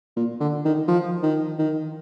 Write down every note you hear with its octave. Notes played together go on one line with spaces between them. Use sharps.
A#2
D3
D#3
F3
D#3
D#3